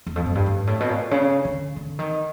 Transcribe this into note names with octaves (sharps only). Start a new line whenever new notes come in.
E2
F2
F#2
G2
G#2
A2
B2
A#2
C#3
D3
D3
D#3